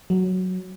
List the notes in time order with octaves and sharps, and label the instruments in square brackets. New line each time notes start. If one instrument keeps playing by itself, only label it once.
[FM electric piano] F#3